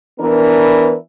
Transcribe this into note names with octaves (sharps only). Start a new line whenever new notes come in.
E3 B3 D4 A#4